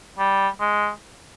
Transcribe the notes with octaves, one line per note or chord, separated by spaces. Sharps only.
G3
G#3